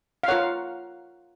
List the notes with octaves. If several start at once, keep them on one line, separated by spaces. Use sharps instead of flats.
F5
F4 A#4 C#5 F#5